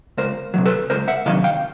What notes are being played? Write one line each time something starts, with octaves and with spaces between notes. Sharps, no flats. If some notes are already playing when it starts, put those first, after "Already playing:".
C#2 A#4 C5
C3 D#3 F#3
A4 B4
C#2 A#4 C5
E5 F#5
C3 D#3 F#3 D#5 F5
F5 G5